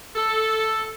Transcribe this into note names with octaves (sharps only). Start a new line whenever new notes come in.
A4